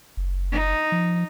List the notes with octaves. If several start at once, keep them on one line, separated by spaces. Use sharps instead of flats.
F#1
D#4
F3